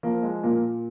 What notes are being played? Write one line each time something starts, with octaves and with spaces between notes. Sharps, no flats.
F3 A#3
G#3
A#2 A#3